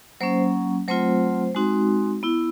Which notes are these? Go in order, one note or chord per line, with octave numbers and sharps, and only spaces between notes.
F#3 A#3 C#4 C5
F#3 A3 C4 F4 C5
G#3 C4 D#4 F#4
B3 E4